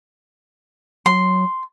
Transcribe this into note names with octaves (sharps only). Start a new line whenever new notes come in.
F#3 C6